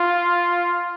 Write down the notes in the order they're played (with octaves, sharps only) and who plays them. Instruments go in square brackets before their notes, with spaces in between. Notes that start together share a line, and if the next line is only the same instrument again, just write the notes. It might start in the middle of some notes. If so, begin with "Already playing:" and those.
Already playing: [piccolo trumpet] F4